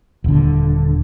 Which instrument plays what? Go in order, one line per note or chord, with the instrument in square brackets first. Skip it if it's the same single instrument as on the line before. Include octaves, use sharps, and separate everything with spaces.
[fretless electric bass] D#1 D3